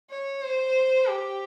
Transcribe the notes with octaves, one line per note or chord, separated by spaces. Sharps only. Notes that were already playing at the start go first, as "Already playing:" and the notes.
C#5
C5
G4